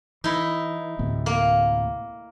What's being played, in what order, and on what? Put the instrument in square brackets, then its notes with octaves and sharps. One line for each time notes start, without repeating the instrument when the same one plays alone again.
[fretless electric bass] E3 [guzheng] D#4 E4
[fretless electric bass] D2 A2 C3
[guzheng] A#3